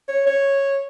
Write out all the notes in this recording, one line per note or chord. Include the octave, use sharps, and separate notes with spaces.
C#5
C#5